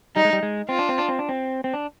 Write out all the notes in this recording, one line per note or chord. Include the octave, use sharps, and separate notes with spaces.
G3 D#4
G#3
G3
G#3
C4 F4
D4
C4
D4
C4
D4
C4
C4
D4